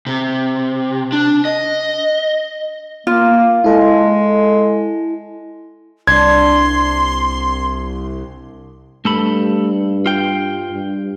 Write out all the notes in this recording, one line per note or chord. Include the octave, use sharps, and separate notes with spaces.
C3
D4
D#5
A#3 F4
G#3 E4 A4
C2 D4 C6 G#6
G2 A3 A4 B5
F4 G5
G2